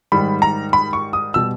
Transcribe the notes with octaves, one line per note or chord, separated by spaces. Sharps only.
G#2 D#3 G3 B5
A#5
B5
C#6
D#6
B2 G3 E6